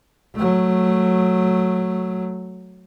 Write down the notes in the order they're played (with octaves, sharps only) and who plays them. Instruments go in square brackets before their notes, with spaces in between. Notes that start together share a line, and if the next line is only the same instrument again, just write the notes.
[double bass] F#3 A3